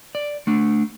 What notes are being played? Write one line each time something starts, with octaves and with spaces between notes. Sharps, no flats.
D5
A3 D4